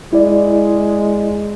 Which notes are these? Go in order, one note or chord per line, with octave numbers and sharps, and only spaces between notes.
G#3 E4 D5